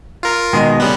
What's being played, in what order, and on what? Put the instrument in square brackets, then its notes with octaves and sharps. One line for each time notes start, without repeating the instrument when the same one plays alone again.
[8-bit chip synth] F4 A#4
[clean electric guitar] B2 D#3 G#3
[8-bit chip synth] C#3 G3 B3